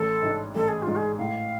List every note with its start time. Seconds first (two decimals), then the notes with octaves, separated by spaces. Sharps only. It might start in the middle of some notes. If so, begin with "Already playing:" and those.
Already playing: A1 A4
0.22 G#2 G#3 D4
0.55 A1 A4
0.68 G#4
0.82 G#2 G#3 D4 F4
0.96 G#4
1.18 A2 F5